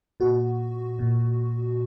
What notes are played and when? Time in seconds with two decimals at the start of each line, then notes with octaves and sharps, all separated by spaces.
0.20 A#2 F#4
0.99 A#2